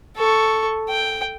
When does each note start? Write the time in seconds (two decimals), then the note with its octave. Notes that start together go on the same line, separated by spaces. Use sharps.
0.17 A4 C#6
0.90 G5